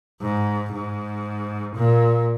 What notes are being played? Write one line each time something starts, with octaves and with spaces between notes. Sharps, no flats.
G#2
G#2
A#2